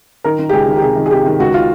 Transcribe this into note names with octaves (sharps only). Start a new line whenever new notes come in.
D#3 A#4
D#3
G4
C#2 G#4
D#3
G4
C3 G#4
D#3
G#4
C3 G4
D#3
C#2 F#4
F4